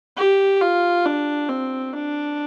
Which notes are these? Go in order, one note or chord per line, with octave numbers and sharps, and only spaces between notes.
G4
F4
D4
C4
D4